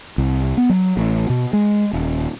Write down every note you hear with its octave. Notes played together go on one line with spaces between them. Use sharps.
C2
B3
F#3
A1
B2
G#3
D#1